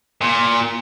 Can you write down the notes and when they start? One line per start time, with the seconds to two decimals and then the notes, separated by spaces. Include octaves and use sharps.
0.22 A#2